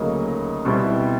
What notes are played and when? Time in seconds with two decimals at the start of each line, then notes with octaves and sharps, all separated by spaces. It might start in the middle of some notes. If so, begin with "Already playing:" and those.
Already playing: D2 C#3 F#3 A#3 D#4
0.65 B2 G3 C4 E4